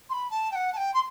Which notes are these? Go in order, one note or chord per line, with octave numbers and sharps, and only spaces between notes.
C6
B5
A5
G5
F#5
A5
G5
C6